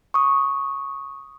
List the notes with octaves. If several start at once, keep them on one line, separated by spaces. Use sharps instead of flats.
C#6 D#6